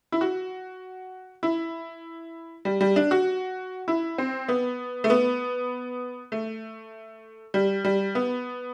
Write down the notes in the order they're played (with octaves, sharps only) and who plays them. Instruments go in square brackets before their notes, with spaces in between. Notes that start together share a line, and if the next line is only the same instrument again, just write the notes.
[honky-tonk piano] E4
F#4
E4
G3
G3
D4
F#4
E4
C4
B3
A3
B3
A3
G3
G3
B3